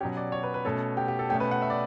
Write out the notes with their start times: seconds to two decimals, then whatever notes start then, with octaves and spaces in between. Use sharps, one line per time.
0.01 B2 F#3 C#4 G4
0.17 D5
0.32 C#5
0.43 B4
0.54 B4
0.65 B2 A3 C#4 A4
0.97 G4
1.08 G4
1.19 A4
1.29 B2 A3 C#4 G4
1.40 B4
1.51 F#5
1.62 E5
1.70 D5